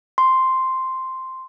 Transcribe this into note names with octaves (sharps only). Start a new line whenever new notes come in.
C6